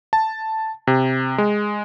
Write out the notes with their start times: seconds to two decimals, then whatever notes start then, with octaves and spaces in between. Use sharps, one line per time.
0.13 A5
0.87 C3
1.38 G#3